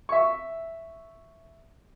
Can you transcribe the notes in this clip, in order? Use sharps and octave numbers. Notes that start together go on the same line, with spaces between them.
E5 C#6